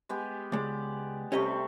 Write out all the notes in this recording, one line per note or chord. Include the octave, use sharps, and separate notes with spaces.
G#3 B3 G4
C#2 G#3 D5
C3 G3 A3 C#4 G4 D#5